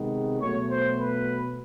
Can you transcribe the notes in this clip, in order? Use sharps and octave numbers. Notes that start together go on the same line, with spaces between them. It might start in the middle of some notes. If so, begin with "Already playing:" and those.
Already playing: C3 D#3 G#3 B3
B2 F#3 A3 C#5
C5
B4